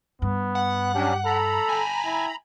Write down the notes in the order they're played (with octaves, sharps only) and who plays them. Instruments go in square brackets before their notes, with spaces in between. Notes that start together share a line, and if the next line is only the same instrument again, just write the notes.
[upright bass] G2 [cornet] B3
[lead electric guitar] F#5
[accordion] F#3 C#4 D4 [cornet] G4
[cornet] A4 [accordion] A#5 B5
[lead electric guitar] G5 G#5
[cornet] E4